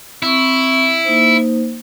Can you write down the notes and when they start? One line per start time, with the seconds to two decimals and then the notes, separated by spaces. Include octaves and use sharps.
0.23 C4 E4 C#6
1.05 A#3 D#4 C5